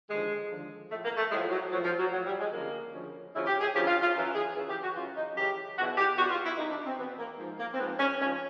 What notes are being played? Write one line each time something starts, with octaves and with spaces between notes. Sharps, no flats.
D#2 D3 F3 G#3
D#2 D3 F3
A2 F3 A3
A#3
A3
A2 F3 G#3
F#3
A2 F3 F#3
F3
F#3
A2 F3 F#3
G3
G#3
D2 C#3 F3 A#3
D2 C#3 F3
D2 C#3 F3 E4
G4
G#4
D2 C#3 F3 G4
F4
F4
F#2 C#3 E3
G#4
F#2 C#3 E3
G4
F#4
F#2 C#3 E3 F4
D#4
F#2 C#3 E3 G4
E2 B2 F#4
G4
E2 B2 F#4
F4
E4
E2 B2 D#4
D4
C4
E2 B2 B3
A#3
G#2 F3
A#3
C4
G#2 F3 B3
C#4
G#2 F3 C#4